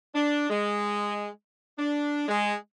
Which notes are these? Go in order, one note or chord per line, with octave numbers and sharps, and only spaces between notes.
D4
G#3
D4
G#3